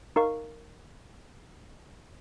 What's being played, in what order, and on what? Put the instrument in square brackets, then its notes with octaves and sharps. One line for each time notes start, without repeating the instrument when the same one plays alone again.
[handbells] D#4 A#4 F5 C#6